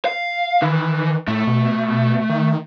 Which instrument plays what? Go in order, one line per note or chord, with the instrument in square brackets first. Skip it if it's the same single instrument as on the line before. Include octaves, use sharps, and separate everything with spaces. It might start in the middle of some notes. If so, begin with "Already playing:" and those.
[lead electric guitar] F5
[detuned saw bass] D#3 [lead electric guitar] E3
[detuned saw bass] A2 [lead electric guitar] A3
[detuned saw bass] B2
D#3